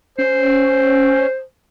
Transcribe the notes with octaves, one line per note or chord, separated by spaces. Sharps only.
C#4 C5